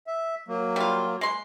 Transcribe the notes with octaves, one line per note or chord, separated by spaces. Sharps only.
E5
F#3 A#3
G3 F4
G#3 C6